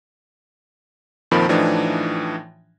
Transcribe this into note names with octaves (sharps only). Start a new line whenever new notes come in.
F2 A#2 D#3 F3 B5
A2 E3 F3 D4 D#4